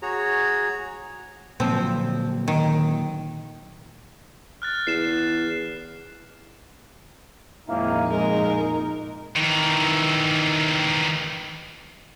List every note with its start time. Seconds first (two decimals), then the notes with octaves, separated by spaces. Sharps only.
0.02 F#4 G#4 C#5 A#5
1.60 A#2 D3 F3 F#3 C4
2.48 D#3
4.62 F6 F#6 A6
4.87 E2 C7 E7
7.68 G#1 F2 A#2 A#3 D#4 E4
8.11 G#3 A#4
9.36 D#3 E3